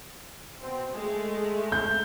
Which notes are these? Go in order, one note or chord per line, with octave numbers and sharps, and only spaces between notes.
B2 C4
G#3 A3
G6